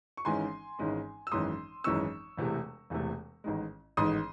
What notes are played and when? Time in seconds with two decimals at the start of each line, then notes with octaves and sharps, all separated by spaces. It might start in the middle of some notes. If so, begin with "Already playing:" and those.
0.17 C#6
0.25 G#1 G#2 E3 G#3 C#4 G#5 C6
0.79 G#1 G#2 E3 G#3 C#4
1.27 E6
1.31 G#1 F#2 E3 G#3 C#4 C6 D#6
1.84 G#1 F#2 E3 G#3 C#4 C#6 E6
2.37 E1 E2 C3 E3 A3
2.90 E1 E2 C3 E3 A3
3.44 A1 G#2 D#3 G#3
3.97 A1 G#2 D#3 G#3 C6 D#6